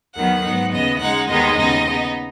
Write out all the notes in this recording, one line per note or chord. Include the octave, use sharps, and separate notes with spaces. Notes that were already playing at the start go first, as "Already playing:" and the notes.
D#2 D#3 F#3 B3 F#5
G#2 F#3 B3 D#4
D#2 C#3 B3 D#5
C#3 G#3 D#4 F#5
D#2 D#3 G#3 B3 D#4 D#5
D#2 C#3 B3 D#4
C#3 B3 D#4